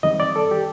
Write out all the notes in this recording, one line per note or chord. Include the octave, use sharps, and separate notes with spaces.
F#2 D#3 G3 C4 D#5
D5
A4
G4